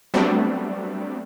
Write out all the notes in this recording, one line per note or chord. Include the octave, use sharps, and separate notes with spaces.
F#3 G3 A3 B3 C4 D4